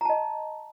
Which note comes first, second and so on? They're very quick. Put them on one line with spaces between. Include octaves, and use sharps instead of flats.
A#5 A5 D#5